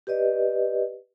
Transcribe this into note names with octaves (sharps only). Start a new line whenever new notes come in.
G4 B4 D5 D#5